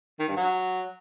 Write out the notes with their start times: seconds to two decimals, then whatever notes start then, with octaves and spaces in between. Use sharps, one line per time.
0.19 D#3
0.28 G2
0.36 F#3